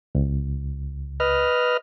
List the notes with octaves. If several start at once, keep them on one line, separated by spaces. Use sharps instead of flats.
C#2
B4 D#5 F6